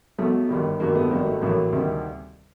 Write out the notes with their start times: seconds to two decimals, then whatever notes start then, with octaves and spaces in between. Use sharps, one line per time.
0.18 B1 B2 F#3 A3
0.49 G1 G2 D#3 G3
0.80 G1 G2 D#3 F#3 A#3
0.95 A3 B3
1.11 G#1 G2 D#3 F#3 A#3
1.26 A3
1.42 A1 A2 F#3 A#3
1.73 D2 C3 D#3 G3